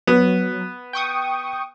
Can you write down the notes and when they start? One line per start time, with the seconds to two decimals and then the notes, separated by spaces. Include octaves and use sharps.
0.07 F#3 B3
0.93 G5 C#6 D#6